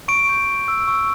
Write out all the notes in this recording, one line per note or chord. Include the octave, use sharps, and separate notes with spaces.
C#6 D7
G6
C#6
E6
C#6